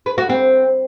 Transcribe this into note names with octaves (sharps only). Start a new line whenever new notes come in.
B4
F#4
C4